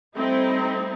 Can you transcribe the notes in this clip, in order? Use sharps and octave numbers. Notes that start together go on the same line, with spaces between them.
G3 A3 C4 D#4 E4